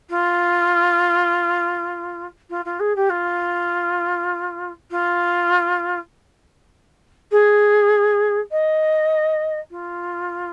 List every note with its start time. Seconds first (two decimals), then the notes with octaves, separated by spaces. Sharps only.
0.10 F4
2.50 F4
2.65 F4
2.80 G#4
2.96 G4
3.09 F4
4.91 F4
7.31 G#4
8.51 D#5
9.71 F4